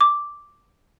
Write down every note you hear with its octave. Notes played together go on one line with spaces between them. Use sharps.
D6